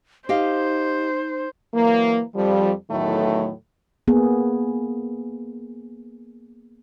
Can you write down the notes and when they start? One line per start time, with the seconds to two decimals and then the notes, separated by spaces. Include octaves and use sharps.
0.29 D#4 G4 C5 D#5 F5
1.74 E3 F#3 A#3
2.35 F2 F3 G3
2.91 E2 A2 D#3 F#3 A3
4.08 A#3 B3 G#4